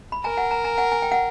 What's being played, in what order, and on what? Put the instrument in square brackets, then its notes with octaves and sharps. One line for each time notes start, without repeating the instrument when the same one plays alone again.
[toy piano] B5
[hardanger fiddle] A#4 [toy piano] G#5 A#5
[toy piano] F#5 G#5
G#5 A#5
G#5 A#5
F#5 G#5
G#5
G5
F#5